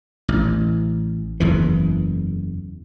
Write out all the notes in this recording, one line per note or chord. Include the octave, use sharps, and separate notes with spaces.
A1
F#1 E2 E3